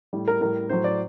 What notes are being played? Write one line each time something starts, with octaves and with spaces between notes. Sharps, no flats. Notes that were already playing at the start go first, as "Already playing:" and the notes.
A2 G3
A#4
A2 G3 A#4
A2 F#3 C5
D5